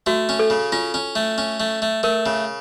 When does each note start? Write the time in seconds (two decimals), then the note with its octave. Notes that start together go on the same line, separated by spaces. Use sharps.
0.06 A3 F#4
0.29 C#4
0.39 A4
0.50 C#3
0.72 C#4 F4
0.94 C#4
1.15 A3
1.38 C#4
1.60 A3
1.82 A3
2.03 A3 A#4
2.26 C#3